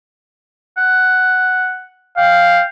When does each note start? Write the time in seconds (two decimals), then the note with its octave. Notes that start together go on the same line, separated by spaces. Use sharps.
0.78 F#5
2.18 F5 G5